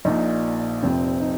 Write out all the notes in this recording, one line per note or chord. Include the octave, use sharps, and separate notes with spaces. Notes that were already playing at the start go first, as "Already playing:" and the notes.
A#1 A#2 D#4
F1 F2 C3 C4
D#4